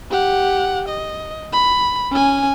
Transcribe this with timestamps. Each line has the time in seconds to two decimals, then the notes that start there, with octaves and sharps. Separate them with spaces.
0.11 G4 F#5
0.89 D#5
1.53 B5
2.11 C#4 G#5